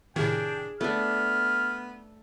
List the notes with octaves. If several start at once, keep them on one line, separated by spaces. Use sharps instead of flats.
A2 C3 D#3 D4 G#4 G5
A3 B3 D4 F6